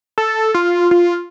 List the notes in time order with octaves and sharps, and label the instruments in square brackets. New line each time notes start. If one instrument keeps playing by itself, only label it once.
[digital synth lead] A4
F4
F4